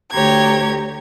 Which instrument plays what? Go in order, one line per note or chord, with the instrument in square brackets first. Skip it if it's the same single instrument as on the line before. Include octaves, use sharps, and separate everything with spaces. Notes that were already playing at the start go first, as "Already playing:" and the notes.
[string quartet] D2 G4 C#5 A#5 G#6